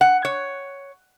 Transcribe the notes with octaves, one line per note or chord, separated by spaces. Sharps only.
F#5
C#5